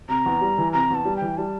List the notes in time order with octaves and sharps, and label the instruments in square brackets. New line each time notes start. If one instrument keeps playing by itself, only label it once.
[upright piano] C3 [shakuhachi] A#5
[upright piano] E2
G3
E3
[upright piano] C3 [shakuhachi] A#5
[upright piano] E2 [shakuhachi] A5
[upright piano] G3
[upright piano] E3 [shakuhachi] G5
[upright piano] G3 [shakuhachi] A5